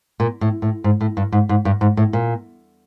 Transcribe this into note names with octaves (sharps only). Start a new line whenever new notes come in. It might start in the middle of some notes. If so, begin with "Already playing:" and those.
A#2
A2
A2
G#2
A2
G2
G#2
G#2
G2
G#2
A2
A#2